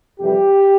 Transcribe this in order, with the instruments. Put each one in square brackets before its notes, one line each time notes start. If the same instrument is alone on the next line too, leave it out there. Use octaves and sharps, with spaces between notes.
[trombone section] F2 C3 E3 G3 G4